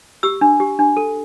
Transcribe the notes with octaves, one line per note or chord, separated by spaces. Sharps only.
G4 E6
D4
G4
D4
A4